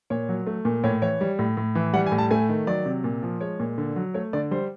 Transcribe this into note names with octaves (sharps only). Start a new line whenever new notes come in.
A#2 C#5
F#3
A3
A#2
A2 C#5
E3 C#5
G3
A2
A2
E3
G3 F#5
G#5
A2
A5
A3 G#5
D#3
F#3 D5
C3
A#2
F3
G#3 C#5
A#2
D3
F#3
A3 C#5
D3 D5
G3 C5